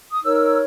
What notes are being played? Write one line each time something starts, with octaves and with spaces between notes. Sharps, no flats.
D#6
D#4 A#4 C#5 E6